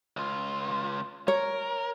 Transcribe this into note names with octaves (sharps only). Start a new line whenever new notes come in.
C#2 F4
A#4 C#5